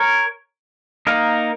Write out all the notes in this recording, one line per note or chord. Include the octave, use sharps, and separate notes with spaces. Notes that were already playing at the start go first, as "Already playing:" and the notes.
Already playing: A#4 C#5
A#3 D#4 A#4